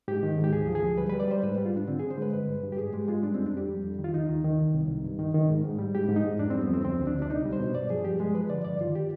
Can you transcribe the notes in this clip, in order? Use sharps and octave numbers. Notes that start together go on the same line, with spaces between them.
G#2 G4
D#3
G#2
G4
D2 G#4
F3
G#4
D2
G3 B4
G3 B4
D5
G3 C5
G#2 B4
G3
F4
G#2 D4
D3 C4
D3 G#4
C5
G#3 B4
G2 B4
G2
G2
G4
G#2 G#4
G#3 G4
G#3 F4
G3 D4
F2 C4
D4
F2 G4
G3
F2
D#3
F4
D#2 D#4
D#3
D#3
C2
C2
C2
G2
D#3
D#3
G#2
G#2
G3
G#2 G4
G#2
D#4
G#2
F2 D4
G3 C4
B3
F2 C4
D2 C4
D2
D4
D2
D4
C2 D#4
G3
C5
B2
G2 D5
F3 G#4
G2 G4
G#3 G#4
F3 B4
D3 D5
G2 D5
D#3 F4
G4